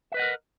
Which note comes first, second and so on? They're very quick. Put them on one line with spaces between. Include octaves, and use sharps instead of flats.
E5 B4 D#5 F#5 A#4